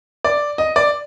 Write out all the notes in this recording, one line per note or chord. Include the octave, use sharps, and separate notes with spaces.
D5
D#5
D5